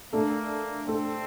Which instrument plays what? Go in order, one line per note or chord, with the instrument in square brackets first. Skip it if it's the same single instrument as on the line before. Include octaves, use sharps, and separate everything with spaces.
[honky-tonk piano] A3 D4 A4 [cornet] A#3
[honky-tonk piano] A3 D4 A4 [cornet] C4